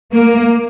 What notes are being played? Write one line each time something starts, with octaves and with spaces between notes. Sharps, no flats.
A#3